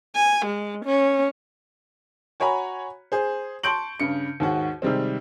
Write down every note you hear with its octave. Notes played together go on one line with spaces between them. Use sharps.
G#5
G#3
C#4
F#4 C#5 G#5 A#5 B5
G#4 C5
A5 C6 C#6 G6 D7 F#7
G2 C#3 C#7
D#2 G#2 F#4
C3 D#3 G3 G#3 C4